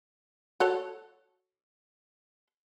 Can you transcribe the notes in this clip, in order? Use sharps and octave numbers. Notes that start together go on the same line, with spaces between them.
F#4 A4 C#5